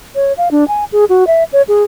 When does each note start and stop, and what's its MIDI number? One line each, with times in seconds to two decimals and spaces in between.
0.16 0.33 73
0.38 0.49 77
0.51 0.67 62
0.68 0.85 80
0.92 1.05 68
1.09 1.27 66
1.27 1.44 76
1.53 1.62 73
1.68 1.84 68